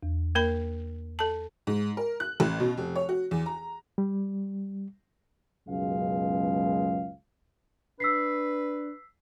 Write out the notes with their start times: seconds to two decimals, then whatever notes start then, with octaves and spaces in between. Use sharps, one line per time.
0.03 E2
0.35 A#3 A#4 B5
1.19 A4 A5
1.67 G#2
1.97 A#4
2.20 F#6
2.40 A1
2.60 B2
2.77 F1
2.95 C#5
3.09 F#4
3.31 E2
3.46 A#5
3.98 G3
5.68 C#2 F#2 B2 G#3 F5
8.00 D4 B4 E6 B6 C7